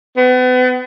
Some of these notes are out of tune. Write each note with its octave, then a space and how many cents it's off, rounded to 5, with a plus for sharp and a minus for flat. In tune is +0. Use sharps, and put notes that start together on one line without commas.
B3 +35